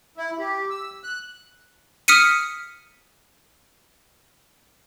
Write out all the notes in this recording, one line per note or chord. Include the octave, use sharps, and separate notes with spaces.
E4
G4
E6
F#6
D#6 F6 B6 C#7 D#7